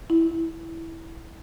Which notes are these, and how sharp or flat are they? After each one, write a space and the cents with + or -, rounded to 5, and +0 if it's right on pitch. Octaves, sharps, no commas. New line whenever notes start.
E4 -5